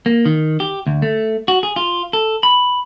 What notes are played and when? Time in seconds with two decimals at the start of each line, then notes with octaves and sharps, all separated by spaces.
0.06 A#3
0.26 D#3
0.60 G4
0.87 D2
1.02 A3
1.48 F#4
1.63 G#4
1.76 F4
2.13 A4
2.43 B5